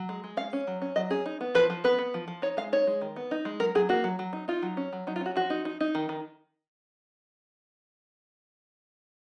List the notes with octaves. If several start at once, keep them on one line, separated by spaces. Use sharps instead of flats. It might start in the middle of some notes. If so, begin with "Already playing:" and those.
Already playing: F#3
G#3
G#3
C#4 F5
C#4
F#3
C#4
F#3 D#5
C#4 G#4
D#4
B3
F3 B4
F3
B3 B4
B3
F3
F3
D#4 C#5
G#3 F5
D#4 C#5
G#3
D#3
B3
D#4
G#3
F#3 A#4
F#3 G#4
A#3 F#4
F#3
F#3
D#4
D#4 F4
F#3
C#4
F#3
F#3 D#4
F4
C#4 F#4
F3 F#4
D#4
D#4
D#4
D#3
D#3